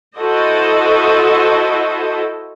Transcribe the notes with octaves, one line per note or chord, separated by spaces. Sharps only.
E4 F#4 A4 C5 D#5